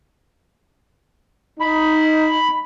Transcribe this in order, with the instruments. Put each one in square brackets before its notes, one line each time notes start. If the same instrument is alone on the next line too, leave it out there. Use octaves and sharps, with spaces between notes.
[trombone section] D#4 [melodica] B5